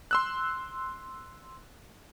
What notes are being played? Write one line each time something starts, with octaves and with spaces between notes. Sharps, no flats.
C6 E6 F#6